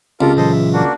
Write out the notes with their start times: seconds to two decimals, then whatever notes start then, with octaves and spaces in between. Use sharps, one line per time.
0.21 C#2 C4 F4 G4 A4 A#4
0.37 A#2 E3 F#3 A4 C5 D#5
0.52 E5
0.73 A#3 D4 F#4